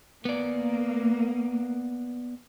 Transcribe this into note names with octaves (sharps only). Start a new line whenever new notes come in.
A#3 B3 D5